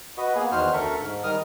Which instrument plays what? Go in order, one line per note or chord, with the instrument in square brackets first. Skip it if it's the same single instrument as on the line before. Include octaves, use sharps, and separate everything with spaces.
[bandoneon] F#4 B4 D#5
A#3 B3 G#4
E2 D#3 F#4 C5 F6
D2 A4 A#4 E5 C#6
G#2
D#3 G3 A#4 D#6 F6